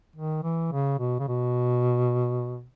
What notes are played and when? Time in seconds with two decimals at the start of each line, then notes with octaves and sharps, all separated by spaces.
0.15 D#3
0.43 E3
0.72 C#3
0.99 B2
1.19 C#3
1.28 B2